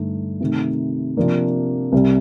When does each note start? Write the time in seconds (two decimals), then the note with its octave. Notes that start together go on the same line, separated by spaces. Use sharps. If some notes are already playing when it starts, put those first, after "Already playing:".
Already playing: G2 D3 A3 D#4
0.40 C3 D#3 A3 D#4
1.17 C3 F3 A#3 D4
1.92 C2 C3 G3